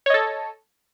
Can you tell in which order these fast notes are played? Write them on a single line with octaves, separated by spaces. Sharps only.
C#5 D#5 A4